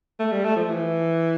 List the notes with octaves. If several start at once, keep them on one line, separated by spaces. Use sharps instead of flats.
A3
G3
A3
F3
E3